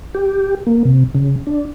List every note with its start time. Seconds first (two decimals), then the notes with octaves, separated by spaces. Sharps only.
0.14 G4
0.67 A#3
0.85 C3
1.15 C#3
1.47 D4